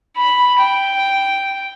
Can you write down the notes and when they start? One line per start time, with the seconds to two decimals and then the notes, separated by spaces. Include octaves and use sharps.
0.17 B5
0.60 G5